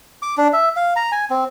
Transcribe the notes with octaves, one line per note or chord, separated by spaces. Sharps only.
D6
D4
E5
F5
A#5
G#5
C4